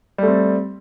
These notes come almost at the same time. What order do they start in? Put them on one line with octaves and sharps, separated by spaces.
G3 A3 C4